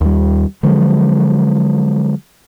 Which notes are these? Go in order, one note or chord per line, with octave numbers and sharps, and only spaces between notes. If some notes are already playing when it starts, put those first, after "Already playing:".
D#2 G3
D3 F3 F#3 G#3